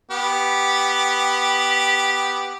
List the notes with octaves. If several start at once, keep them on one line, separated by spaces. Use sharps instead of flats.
B3 G4